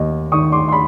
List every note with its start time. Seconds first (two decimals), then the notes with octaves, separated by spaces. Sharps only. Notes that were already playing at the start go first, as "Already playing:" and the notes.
Already playing: D#2 D#3 D#5
0.32 D#3 C#6 D#6
0.52 C6 D6
0.68 C6
0.72 B5